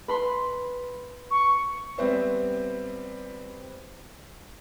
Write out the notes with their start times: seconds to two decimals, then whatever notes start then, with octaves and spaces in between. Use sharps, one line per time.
0.08 B4 B5 C6
1.31 C#6
1.98 G3 B3 C4 B4 C5 E5